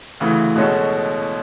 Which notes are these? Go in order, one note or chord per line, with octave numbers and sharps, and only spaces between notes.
D2 C#3 E3
B2 G#3 C#4 F#4 A4